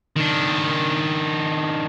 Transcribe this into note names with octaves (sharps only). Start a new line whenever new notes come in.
D#3 D4